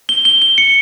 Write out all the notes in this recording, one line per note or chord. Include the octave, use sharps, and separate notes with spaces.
G7
G7
G7
C#7